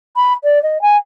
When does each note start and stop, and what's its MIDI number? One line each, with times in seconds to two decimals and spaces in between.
0.16 0.33 83
0.44 0.62 74
0.63 0.81 75
0.82 0.97 80